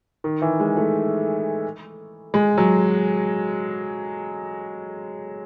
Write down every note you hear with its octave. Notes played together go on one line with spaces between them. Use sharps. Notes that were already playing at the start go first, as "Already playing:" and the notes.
D#3
E3
G#3
A3
G#3
F#3